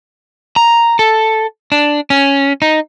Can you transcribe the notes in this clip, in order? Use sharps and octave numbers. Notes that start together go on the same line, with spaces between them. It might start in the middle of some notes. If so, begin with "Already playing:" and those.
A#5
A4
D4
C#4
D#4